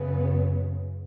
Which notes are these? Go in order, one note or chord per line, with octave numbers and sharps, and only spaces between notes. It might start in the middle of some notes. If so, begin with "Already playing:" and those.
Already playing: F#2 C#3 B3